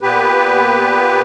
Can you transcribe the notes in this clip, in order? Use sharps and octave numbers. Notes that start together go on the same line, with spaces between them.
A#2 B3 G4 B4